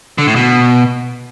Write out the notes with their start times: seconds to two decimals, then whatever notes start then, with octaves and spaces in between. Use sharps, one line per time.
0.18 D3
0.27 A2
0.36 B2